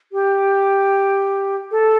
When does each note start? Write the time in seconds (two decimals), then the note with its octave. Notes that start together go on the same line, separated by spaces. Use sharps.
0.12 G4
1.71 A4